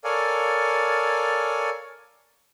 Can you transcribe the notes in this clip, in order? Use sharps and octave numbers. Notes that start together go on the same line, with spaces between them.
A4 A#4 C#5 D5 F5 G#5